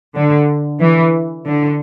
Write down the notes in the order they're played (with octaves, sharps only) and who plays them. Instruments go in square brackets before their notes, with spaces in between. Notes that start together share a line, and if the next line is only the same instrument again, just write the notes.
[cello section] D3
E3
D3